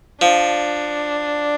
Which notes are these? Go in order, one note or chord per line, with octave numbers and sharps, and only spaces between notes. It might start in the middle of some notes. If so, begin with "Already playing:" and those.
F3 D4